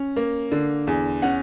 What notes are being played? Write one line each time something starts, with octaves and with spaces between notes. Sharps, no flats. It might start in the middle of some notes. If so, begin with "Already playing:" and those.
Already playing: C#4
A#3
D3
E2
C#4 F#5